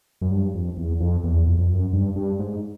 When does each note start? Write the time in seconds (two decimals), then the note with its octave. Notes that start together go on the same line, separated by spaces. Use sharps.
0.21 F#2
0.31 G2
0.54 F2
0.77 E2
1.00 F2
1.24 E2
1.47 F2
1.58 F2
1.70 F#2
1.93 G2
2.16 G2
2.39 G#2